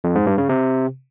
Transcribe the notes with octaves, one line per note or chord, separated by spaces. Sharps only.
F2
G#2
G2
C#3
C3